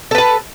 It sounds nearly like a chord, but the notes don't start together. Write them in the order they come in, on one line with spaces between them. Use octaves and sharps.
A4 B4 A5